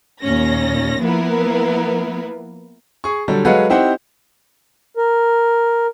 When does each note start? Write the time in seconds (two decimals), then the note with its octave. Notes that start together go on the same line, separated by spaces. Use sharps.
0.21 D#2 A#2 C#4 A#6
1.01 F3 A#3 B3 E4 A#4 B4
3.04 G#4 C#6
3.28 D3 F#3 G3 A4
3.45 F#3 G#3 A4 B4 F5 F#5
3.70 C4 D#4 E4 G4 C5 F#5
4.96 A#4